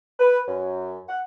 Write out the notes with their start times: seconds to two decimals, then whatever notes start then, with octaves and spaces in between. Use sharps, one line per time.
0.20 B4
0.48 F#2
1.09 F#5